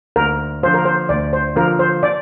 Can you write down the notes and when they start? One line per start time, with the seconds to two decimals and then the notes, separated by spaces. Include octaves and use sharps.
0.16 D2 A#4
0.63 D3 F3 A#3 F4 C5
0.74 A#4
0.85 C5
1.09 D2 D5
1.33 C5
1.56 D3 F3 A#3 F4 A#4
1.79 C5
2.03 D5